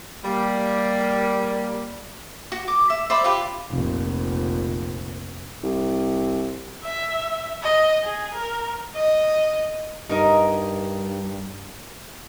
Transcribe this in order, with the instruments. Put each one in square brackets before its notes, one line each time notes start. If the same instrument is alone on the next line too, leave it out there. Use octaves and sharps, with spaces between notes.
[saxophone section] G3 A#3
[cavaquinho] F#4
D6
E5
C5 D5 E5 B5
F4 G4 B4
[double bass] F1 A#1
[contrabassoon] C2
[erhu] E5
D#5
G#4
A#4
[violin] D#5
[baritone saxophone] G2 [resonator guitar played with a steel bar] D#4 A#4 D#5